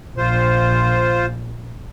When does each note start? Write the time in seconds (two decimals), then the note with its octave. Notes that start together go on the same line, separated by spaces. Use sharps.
0.17 A#1 F4 C5